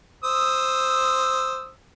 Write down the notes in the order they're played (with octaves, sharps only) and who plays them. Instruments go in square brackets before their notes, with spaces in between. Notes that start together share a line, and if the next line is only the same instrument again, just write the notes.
[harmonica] C5 D#6 E6